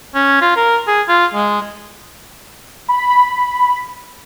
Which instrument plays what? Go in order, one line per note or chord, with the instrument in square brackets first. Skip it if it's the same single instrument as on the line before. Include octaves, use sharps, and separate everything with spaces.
[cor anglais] C#4
F4
A#4
G#4
F4
G#3
[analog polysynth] B5